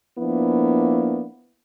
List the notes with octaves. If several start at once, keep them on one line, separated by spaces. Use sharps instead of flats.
F3 A#3 B3 D4 E4